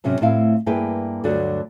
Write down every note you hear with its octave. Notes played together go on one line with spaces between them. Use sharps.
G#2 C3 F#3 C#4
A2 C4 E4 F5
G2 A#3 E4 G#4 B4 G5
D2 G2 D3 F#3 F#4 D5